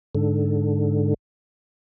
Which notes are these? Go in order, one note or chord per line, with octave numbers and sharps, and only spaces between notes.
G#2 D3